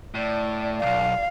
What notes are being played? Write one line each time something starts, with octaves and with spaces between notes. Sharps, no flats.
A2 D5
B1 F2 F5